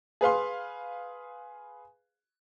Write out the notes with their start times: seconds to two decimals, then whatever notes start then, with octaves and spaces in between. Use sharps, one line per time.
0.21 G#4 B4 F5 C6